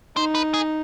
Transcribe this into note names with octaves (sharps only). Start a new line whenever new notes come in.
D#4 C5
B4
G#4